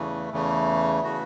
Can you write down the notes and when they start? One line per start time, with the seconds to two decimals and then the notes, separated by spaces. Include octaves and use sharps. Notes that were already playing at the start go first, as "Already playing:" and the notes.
Already playing: E2 C#3 E3 A3
0.32 E2 C#3 E3 A3
1.04 C#3 E3 A3 F#4